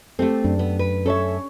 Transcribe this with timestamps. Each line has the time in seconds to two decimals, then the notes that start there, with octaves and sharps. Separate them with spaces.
0.19 A3 C4 G4 A4
0.44 F#2 D4
0.59 B3
0.79 B4
1.06 C#4 A4 C#5 E5